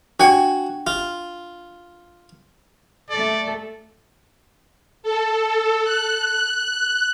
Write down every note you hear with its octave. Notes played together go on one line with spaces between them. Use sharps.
D4 F#4 G5 G#5
F4
A3 A4 D5
A4
F#6